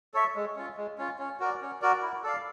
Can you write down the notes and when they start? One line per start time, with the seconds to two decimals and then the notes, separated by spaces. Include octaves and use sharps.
0.14 A4 C#5 E5
0.35 G#3
0.56 C#4 F4
0.77 G#3
0.98 C#4 F4
1.19 C#4
1.40 F#4 A#4 D5
1.61 C#4
1.81 F#4 A#4 D5
2.02 E4
2.23 A4 D5 F5